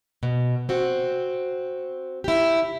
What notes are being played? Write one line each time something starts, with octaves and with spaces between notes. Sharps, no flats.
B2
C4 F#4
E4 G4